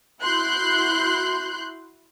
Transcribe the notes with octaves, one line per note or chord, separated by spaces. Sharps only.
E4 F#4 C6 F#6 G6